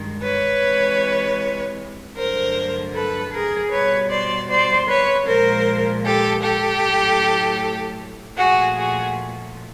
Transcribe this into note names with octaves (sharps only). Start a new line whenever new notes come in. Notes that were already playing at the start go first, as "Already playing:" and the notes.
Already playing: G2 D#3 G#3
B4 C#5
C3 E3 G#3
G2 D3 F#3 A3 A#4 C5
A4 B4
G#4 A#4
B2 G3 B4 C#5
C5 D5
C5 D5
B4 C#5
A#2 F3 G#3 A#4 C5
G4 A4
G4 A4
A2 F#3 A3
A#2 F3 A3 F#4 G#4
F#4 G#4